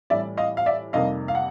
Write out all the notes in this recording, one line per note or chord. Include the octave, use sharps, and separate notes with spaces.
A2 E3 G3 D5 E5
D#5 F5
F5
D5 E5
F2 C3 D#3 G3 A#3 D#5 F5
F5
F#5